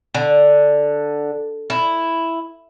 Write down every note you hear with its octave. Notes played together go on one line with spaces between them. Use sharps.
D3
E4